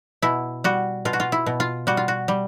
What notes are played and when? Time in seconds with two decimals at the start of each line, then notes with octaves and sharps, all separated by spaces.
0.22 B2 E4
0.64 G3 F#4
1.05 B2 F4
1.13 F#4
1.20 F4
1.32 E4
1.46 B2
1.60 F4
1.87 G3 F#4
1.97 F4
2.08 F#4
2.28 G3